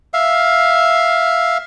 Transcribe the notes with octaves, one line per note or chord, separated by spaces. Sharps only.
E5 F5